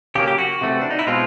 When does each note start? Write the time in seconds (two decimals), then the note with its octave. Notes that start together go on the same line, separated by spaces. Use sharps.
0.15 C#3 F#3 A#3 G4
0.28 G4
0.38 F#4
0.61 C3 E3 A3
0.81 D4
0.91 D#4
0.99 E4
1.07 B2 G#3 C4 F4